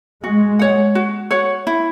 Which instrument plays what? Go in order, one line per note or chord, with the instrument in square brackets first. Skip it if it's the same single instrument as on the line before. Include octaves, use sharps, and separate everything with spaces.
[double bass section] G#3 [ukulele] F#4
[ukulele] C#5 F#5
F#4
C#5 F#5
E4